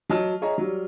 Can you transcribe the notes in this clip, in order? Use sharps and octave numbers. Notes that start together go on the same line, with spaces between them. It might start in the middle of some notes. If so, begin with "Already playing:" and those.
F#3 D#5 A5 F6
G#4 C#5 D#5 E5 A#5
F#3 G3